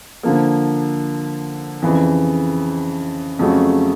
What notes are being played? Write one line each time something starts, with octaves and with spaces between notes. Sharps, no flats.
D3 F3 A#3
F2 C#3 E3
F2 C#3 F#3 A3